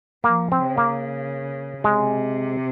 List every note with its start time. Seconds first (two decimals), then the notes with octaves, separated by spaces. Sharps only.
0.24 F3 A#3
0.52 C4
0.65 C#3
0.78 A#3
1.83 C3 G#3